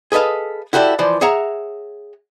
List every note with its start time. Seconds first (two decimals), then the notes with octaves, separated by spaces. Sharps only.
0.12 G#4 A4 B4 D#5 F5
0.73 E4 F#4 G4 A4 B4 D5
0.99 E3 F3 C5 D5
1.21 G#4 C#5 E5 F#5 A#5